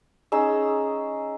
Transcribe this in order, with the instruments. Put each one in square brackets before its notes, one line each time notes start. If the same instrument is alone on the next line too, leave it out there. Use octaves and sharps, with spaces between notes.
[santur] C#4 D#4 G#4 E6